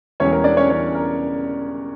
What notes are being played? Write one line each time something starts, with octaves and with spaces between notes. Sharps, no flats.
E1 E2 E3 G3 C#4 C#5
A#4
D4 D5
C#4 C#5
E1 E2 E3 G3 C#4 C#5
A#4